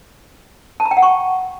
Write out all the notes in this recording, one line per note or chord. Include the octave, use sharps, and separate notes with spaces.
A5
A#5
G5
F#5
C#6